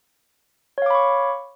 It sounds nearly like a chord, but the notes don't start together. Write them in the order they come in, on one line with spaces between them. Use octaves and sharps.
C#5 F5 D6 B5 C#6